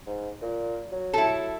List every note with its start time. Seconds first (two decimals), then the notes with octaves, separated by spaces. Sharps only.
0.07 G#2
0.42 A#2
0.92 F#3
1.13 E4 A4